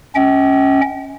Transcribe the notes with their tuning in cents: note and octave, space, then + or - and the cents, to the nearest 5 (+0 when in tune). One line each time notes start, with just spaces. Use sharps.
C#4 +0 D#5 +45 G5 -40